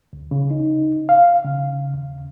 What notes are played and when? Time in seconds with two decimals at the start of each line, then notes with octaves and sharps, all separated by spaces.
0.13 D2
0.31 C#3
0.51 D#4
1.09 F5
1.45 C#3
1.94 D#2